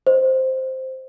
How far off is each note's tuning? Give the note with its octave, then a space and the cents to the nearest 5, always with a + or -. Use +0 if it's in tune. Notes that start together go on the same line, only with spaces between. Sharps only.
C5 +0 D#5 +0